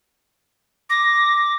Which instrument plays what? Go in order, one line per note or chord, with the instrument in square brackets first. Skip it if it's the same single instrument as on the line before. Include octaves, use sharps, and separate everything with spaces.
[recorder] D6 [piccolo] A#6